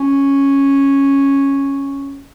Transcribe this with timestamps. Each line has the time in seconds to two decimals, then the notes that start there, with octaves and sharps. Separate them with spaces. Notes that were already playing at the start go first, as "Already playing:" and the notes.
Already playing: C#4